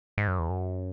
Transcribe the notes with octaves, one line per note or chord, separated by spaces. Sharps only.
G#2
F#2
E2
F#2